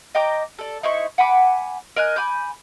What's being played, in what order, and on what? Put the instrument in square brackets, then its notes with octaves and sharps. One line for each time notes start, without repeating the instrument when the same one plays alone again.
[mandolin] D#5 G5 A#5 D6
A4 D5
D#4 E4 C5 C#6
F#5 G#5 B5 D6
A#4 D#5 G#5 F#6
G#5 B5 D6 G6